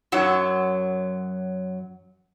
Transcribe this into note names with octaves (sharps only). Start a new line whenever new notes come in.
F#2 F#3 F#5